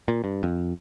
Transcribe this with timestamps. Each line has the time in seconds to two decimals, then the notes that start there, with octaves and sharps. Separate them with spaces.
0.08 A#2
0.24 G2
0.43 F2